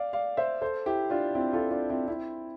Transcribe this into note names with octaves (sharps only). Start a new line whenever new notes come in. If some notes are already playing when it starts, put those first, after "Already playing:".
Already playing: D5 F5
D5 F5
C5 E5
A4 C5
E4 G4
D4 F4
C4 E4
F4 A4
D4 F4
C4 E4
C4 E4